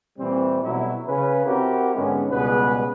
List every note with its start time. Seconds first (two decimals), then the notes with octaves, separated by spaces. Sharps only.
0.19 A#2 E3 G3 C4
0.63 B2 F#3 G3 A3 E4
1.07 C#3 C#4 B4
1.45 C4 E4 F#4 G4 A#4
1.96 G#2 D3 G#3 B3 C#4
2.31 C#2 B2 G3 B3 G#4 B4